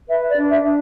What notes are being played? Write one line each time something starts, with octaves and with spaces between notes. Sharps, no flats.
B4 E5
D5
D4
E5
D4